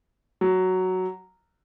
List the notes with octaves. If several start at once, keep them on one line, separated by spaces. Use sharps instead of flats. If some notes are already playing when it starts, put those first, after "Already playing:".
F#3